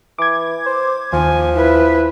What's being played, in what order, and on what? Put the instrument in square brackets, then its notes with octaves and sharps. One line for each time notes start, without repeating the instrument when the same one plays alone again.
[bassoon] E3 [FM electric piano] D6 G#6
[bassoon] C5
[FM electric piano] D#2 [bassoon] F3 [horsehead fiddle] G#5
[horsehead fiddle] E4 B4